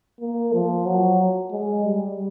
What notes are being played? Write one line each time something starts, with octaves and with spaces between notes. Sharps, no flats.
A#3
F3
F#3
G#3
G3